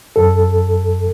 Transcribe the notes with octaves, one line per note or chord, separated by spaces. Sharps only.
F#2 A4